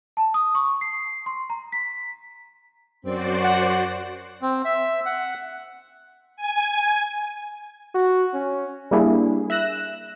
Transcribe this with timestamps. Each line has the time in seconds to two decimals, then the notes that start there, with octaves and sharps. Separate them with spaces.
0.17 A5
0.34 D#6
0.55 C#6
0.81 C7
1.26 C6
1.50 A#5
1.72 B6
3.05 F#2 C4 F#4 C5 D5
3.44 F#5
4.42 C4
4.65 E5
5.06 F#5
6.37 G#5
7.95 F#4
8.34 C#4
8.91 G3 A#3 D4 E4 G#4
9.50 E5 F#6 A#6 E7